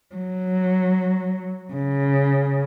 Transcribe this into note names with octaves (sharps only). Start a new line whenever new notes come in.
F#3
C#3